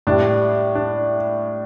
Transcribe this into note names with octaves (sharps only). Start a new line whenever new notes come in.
A2 G3 D4
D4